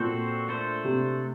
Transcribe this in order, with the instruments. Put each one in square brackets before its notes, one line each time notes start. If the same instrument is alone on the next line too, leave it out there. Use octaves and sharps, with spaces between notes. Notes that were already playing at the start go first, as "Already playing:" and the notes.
Already playing: [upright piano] A#2 [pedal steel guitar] C4 F#4 A4 C5
[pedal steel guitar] A3 D4 A4 C5
[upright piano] C3